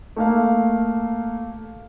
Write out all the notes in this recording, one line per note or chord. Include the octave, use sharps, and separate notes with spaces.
A3 A#3 F5